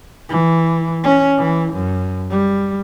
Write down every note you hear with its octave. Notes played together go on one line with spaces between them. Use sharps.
E3
C#4
E3
F#2
G3